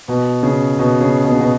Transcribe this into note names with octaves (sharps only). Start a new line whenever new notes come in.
B2
C#3
B2
C#3
B2
C#3
B2